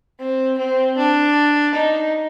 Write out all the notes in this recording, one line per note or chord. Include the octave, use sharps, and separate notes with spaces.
C4
C4
D4
D#4